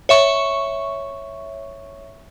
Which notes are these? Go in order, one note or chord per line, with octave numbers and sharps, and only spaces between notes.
C#5 E5 C#6